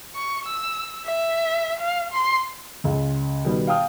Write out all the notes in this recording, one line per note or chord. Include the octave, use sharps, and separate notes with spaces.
C#6
E6
E5
F5
C6
C#2 C#3
B2 D#3 G3 B3
F5 G5 A5 D#6 F6